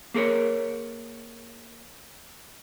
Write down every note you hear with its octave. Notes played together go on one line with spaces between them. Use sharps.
A#3 G#4 A#4 C#5